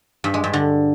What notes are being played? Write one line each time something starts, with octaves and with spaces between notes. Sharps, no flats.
G2
G#3
G2
D3